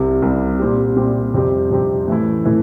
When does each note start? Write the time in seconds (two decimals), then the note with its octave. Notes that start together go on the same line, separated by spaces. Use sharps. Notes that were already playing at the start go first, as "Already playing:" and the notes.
Already playing: C2 C3 G3
0.22 C2 C3 G3
0.59 A#2 G3 C4 G4
0.96 A#2 G3 C4 G4
1.34 F2 C3 G3 C4 G4
1.71 F2 C3 G3 C4 G4
2.08 A2 E3 A3 E4
2.45 A2 E3 A3 E4